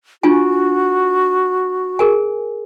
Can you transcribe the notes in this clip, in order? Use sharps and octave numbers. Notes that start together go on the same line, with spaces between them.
D4 F4 F#4 G#5
G#4 A#4 G#5